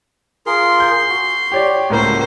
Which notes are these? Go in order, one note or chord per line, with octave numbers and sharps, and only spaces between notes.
F4 G#4 A#4 C6
G6
F#4
G4 C#5 D5
C#2 A2 A#3 A#4 C5